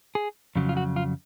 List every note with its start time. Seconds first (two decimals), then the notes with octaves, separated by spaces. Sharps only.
0.15 G#4
0.56 F2 C#3 F#3
0.69 F4
0.77 F#4
0.96 F4